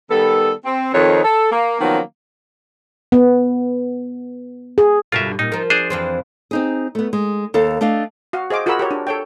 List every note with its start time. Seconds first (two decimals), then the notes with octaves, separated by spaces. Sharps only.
0.11 D#3 G3 B3 A4
0.65 C4
0.94 F2 D#3 C#5
1.24 A4
1.52 A#3
1.81 D#3 F3 F#3 A#3 B3 C#4
3.12 B3
4.78 G#4
5.12 G2 B2 D3 F4 A#4 E5
5.39 A#2 D#4
5.52 F3 A#4
5.70 D4 G#4 C5
5.90 F2 E3 C4
6.51 C4 D#4 G#4
6.95 A3 B3
7.13 G#3
7.54 D#2 A4 F5
7.81 A3 D4 D#5 F5
8.33 F#4 F5
8.50 G#4 C5 D#5 F5 D6
8.66 F4 F#4 G#4 A#4 B5 E6
8.79 G4 A#4 C#5
8.91 D4
9.07 A4 C#5 G5